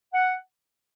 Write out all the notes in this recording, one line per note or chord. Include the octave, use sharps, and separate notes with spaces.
F#5